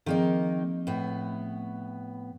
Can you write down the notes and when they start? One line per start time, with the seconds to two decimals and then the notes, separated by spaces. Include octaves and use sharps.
0.06 D#3 F3 A#3 C4 D#4 G#4
0.87 A2 B3